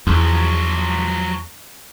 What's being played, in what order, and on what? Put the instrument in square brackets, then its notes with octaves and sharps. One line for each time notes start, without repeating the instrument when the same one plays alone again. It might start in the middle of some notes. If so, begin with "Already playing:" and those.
[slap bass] E2 [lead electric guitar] F3 F#3